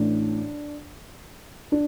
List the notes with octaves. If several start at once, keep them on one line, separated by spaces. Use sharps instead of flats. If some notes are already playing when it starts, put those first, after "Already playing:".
Already playing: A1 A2 E3 D4
D4